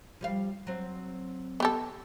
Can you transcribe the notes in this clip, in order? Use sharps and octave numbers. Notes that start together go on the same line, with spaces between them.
F3 G3 F5
F#3 C4
B3 G4 A4